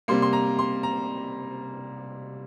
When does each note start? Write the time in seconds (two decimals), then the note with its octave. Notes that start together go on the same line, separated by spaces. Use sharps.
0.08 C3 G3 A#3 C6
0.22 C6
0.33 A#5
0.59 C6
0.83 A#5